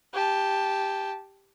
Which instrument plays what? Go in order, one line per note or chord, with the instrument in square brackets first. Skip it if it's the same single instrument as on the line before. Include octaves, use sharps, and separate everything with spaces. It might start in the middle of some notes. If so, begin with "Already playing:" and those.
[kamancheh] G4 A5